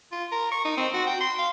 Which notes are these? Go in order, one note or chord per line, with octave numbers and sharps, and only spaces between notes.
F4
A#4
C#6
D#4
C4
F#4
G5
C6
F5